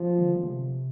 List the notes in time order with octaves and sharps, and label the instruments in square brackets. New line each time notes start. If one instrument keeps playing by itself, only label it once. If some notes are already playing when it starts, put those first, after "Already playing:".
Already playing: [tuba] F3
[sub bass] D3
D3
C3